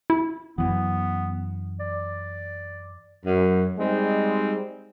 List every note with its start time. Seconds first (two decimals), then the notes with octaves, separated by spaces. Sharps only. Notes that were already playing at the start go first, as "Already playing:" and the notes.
0.10 E4
0.58 F#2 E3 B3
1.80 D5
3.25 F#2
3.78 G3 G#3 C4 D#4